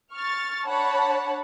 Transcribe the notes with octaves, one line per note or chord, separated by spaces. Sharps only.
C#6 F6 A6
D4 C#5 F#5 A5 B5